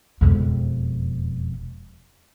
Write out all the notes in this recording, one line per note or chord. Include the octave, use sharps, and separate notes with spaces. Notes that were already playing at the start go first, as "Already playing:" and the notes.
E1 F2